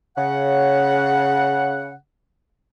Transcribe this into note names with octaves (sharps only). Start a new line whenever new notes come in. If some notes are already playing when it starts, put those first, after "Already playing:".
C#3 F#5